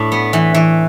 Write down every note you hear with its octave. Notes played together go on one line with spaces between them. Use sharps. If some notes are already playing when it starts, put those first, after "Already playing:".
Already playing: A2 D4 D5
B3
E3
E3